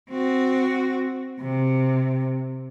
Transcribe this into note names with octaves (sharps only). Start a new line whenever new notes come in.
C4 F#4
C3